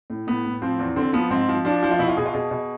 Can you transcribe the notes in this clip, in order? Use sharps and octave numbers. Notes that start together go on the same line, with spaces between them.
A2
A2 B3
A2
F3 C4
E2
D3 C4
F3 B3
G#2 C4
F3
F3 D4
F3
F4
B2 E4
F4
B2 G#4
F4
B2 G#4
B2